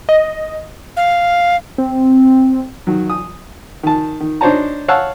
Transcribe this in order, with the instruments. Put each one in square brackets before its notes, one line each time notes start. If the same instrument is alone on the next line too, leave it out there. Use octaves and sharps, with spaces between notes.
[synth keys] D#5
[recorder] F5
[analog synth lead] C4
[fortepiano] D#3 F#3
D#6
D#3 A5
D#3
D4 D#4 C5 C#5 A5 A#5
C#5 F5 F#5 A5 E6 F#6